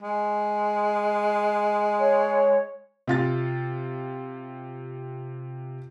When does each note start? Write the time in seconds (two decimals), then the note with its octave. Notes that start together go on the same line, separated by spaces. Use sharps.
0.02 G#3
2.00 C#5
3.07 C3 F4 A6